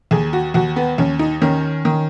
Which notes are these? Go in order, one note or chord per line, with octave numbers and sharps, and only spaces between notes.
D#2 G#4
F#4
D#2 F#4
B3
D#2 C#4
D#4
D#3 C#4
D#3